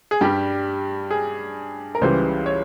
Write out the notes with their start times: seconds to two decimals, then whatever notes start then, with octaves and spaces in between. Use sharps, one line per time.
0.11 G#4
0.21 G2 G3 G4
1.11 G#4
1.95 A#4
2.01 C#2 C#3 E3 G3 C5
2.46 C#5